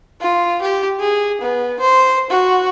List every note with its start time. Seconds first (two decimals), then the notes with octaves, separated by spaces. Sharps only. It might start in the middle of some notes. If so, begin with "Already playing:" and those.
0.21 F4
0.62 G4
1.00 G#4
1.41 B3
1.80 C5
2.31 F#4